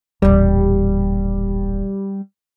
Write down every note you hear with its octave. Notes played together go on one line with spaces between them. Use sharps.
D#1 A1 G3